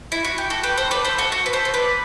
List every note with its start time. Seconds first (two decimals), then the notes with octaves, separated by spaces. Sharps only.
0.12 E4
0.25 F#4
0.38 G4
0.50 F#4 A4
0.63 G4 B4
0.78 A4 C5
0.91 B4 D5
1.05 A4 C5
1.18 F#4 A4
1.32 F#4
1.46 B4
1.53 A4 C5
1.65 C5
1.74 B4 D5